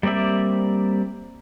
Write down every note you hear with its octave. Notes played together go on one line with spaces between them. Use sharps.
G3 A#3 C4 D5 E5